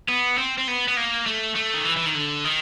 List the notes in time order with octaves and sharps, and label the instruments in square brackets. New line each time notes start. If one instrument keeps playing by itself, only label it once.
[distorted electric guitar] B3
C4
C4
B3
B3
A#3
A3
A3
D#3
E3
E3
D#3
D3
D#3